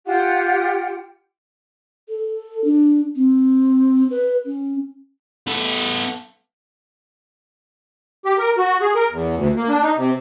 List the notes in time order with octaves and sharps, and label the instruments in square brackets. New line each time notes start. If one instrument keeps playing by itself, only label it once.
[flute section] F4 G4 F#5 G5
[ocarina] A4
D4
C4
B4
C#4
[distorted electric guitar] B3 A4
[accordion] G4
A#4
F#4
G#4
A#4
E2
D2
A#3
D4
D#4
C3